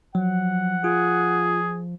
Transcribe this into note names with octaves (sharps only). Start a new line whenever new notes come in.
F3 F#3 F#5
F4 G#4